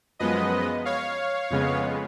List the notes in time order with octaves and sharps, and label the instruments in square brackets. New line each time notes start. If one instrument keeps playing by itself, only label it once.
[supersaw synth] F#2 F3 G#3 B3 B4 D#5
C#5 F5
F2 C#3 G#3 B3